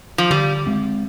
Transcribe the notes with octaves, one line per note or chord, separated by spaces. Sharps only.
F3
D3 G3
G#3 C4